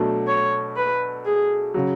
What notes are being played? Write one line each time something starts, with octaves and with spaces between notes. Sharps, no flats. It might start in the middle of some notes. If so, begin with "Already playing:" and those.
Already playing: B2 F#3 A3 D4
C#5
B4
G#4
C#3 F#3